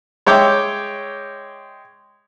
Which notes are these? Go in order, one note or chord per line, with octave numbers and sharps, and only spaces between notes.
G#3 C#5 E5 G5 D6